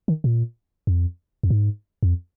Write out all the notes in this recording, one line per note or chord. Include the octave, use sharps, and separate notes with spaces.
D#3
A#2
F2
F2
G#2
F2